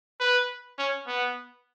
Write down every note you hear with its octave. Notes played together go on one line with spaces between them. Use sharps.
B4
C#4
B3